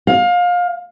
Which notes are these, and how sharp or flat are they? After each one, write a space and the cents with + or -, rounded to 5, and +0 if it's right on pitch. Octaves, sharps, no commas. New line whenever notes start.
F5 +25